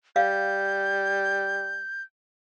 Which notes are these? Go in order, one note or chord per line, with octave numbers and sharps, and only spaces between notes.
G3 F5 G6